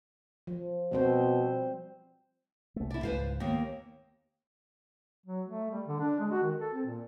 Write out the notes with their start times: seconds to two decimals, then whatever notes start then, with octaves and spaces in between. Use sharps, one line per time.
0.47 F3
0.92 B2 G3 C4 C5
2.76 C2 A3
2.91 E4 D5
3.03 C#2 G#2 B4 C5 F5
3.40 D#2 A#3 B3
5.26 F#3
5.47 A3
5.71 G3
5.87 D3
6.00 D4
6.20 G#3
6.31 F#4
6.43 D#3
6.58 A4
6.73 C4
6.86 A#2